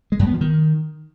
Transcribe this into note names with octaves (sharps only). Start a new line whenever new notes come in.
G#3
F#2
B3
F3
D#3